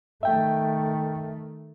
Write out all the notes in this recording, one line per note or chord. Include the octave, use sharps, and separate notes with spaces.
D#3 A3 E5 G5